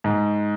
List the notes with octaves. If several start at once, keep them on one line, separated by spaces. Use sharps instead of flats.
G#2